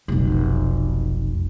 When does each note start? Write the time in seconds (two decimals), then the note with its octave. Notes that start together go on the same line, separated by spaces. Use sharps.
0.08 F1 B1